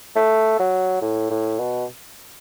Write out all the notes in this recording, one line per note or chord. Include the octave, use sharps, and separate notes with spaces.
A3
F#3
A2
A2
B2